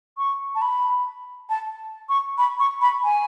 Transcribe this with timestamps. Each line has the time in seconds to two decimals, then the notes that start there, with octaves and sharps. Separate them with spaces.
0.18 C#6
0.55 A5
0.62 B5
1.49 A5
2.09 C#6
2.38 B5
2.59 C#6
2.81 B5
3.04 G#5